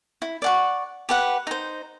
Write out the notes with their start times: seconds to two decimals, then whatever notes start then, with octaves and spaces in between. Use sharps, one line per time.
0.22 E4
0.42 D5 F#5 C#6
1.09 G4 B4 F#5
1.47 D#4 C5